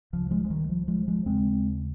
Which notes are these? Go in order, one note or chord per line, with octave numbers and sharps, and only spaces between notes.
C#2 C#3 F3
F3 G#3
G#3
D#3 G3
F3
F3 G#3
F3 G#3
D#2 C#3 G#3 C4